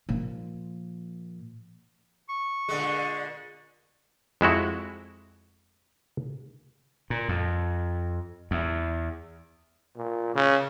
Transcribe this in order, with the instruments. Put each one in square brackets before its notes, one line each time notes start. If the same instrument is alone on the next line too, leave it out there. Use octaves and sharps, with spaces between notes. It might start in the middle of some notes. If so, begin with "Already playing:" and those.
[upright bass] A#2 F3
[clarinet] C#6
[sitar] A#2 D3 G#3
[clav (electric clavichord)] F2 G#3 E4 F#4
[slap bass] A#2
F2
E2
[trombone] A#2
C#3